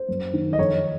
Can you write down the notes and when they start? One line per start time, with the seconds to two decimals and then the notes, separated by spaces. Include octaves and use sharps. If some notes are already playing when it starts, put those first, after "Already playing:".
Already playing: C5
0.09 F#2
0.33 D#3
0.53 D#5
0.58 F2 C#5